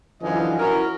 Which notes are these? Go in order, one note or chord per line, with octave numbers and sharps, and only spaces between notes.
F#2 D3 E3 F3 D#5 G#5
C#4 E4 F#4 A#4